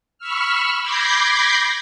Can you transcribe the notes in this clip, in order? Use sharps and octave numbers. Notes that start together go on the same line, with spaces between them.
B5 C#6 E6 F6
B5 D6 G6 G#6 A#6 C7